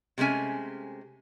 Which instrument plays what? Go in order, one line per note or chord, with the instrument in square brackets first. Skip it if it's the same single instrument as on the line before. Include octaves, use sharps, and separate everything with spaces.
[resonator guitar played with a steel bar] C3 G#3 A3 C#4 G#5